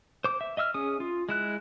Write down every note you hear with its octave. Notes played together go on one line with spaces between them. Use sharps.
C5 D6
E5
D#5 E5 E6 F6
C#4 G#4 D#6
F4
G#3 E4 F#6